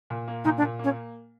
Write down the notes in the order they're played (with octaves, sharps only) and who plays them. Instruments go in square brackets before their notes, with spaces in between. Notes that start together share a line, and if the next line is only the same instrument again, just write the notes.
[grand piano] A#2
A#3
[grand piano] A#2 [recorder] D#4
[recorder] D4
[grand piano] A#2
[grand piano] A#3 [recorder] C#4